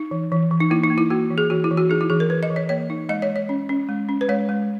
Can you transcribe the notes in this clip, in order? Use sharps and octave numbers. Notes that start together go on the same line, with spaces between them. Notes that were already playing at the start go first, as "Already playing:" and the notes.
Already playing: D#4
E3
E3
E3
D#4
A#3 E4
D#4
A#3
E4
A#3 F#4
E3
G#4
E3 F#4
E4
E3
F#4
D#4 G#4
E4
E3 G#4
A#4
E3 B4
D#5
E3
C#5
A#3 C#5
D#4
G#3 D#5
C#5
G#3
C#5
C#4
C#4
G#3
C#4
B4
G#3 C#5
G#3